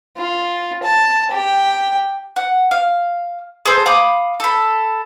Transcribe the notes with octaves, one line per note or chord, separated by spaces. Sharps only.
F4
A5
G4 G5
F#5
F5
G#4 A4 C5
F5 B5 D6 D#6
A4 B5